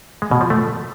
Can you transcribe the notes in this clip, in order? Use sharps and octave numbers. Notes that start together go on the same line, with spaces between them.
G#3
B2
F3
A3